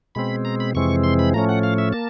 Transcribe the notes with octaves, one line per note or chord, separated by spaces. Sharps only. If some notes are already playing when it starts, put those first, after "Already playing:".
B2 G#3 C4 B5
A#5
B5
F2 C3 E3 G#3 C4 C#6
C6
B5
A2 F3 A3 C#4 A#5
F#5
F5
E5
A#3 A5